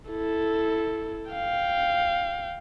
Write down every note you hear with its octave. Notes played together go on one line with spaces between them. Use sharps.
E4 A4
F5 G5